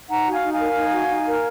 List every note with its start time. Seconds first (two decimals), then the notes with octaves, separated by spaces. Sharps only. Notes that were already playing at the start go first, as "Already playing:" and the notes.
0.09 D#4 F#5 A#5
0.26 F#4
0.32 F5 G#5
0.43 D#4
0.54 F5 G#5
0.59 A#4
0.76 D#4
0.93 F#4
1.09 D#4
1.26 A#4